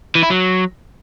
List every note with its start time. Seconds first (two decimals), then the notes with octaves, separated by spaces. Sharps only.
0.15 E3
0.23 E4
0.30 F#3